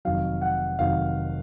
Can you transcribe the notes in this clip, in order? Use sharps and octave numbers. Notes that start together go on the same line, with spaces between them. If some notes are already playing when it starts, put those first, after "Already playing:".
F1 F2 D#3 F#3 F5
F#5
F1 F2 D#3 F#3 F5